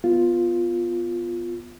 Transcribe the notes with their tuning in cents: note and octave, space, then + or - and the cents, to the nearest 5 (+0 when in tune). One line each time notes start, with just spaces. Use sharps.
B3 +0 F4 +0